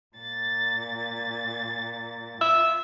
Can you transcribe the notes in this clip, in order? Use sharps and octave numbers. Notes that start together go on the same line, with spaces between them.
A#2 A6
F4 E5